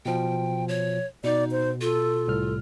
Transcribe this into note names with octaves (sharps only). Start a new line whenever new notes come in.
B2 F3 G5
C#5
B2 D#4 D5
C5
F4 A4
C2 A2 F6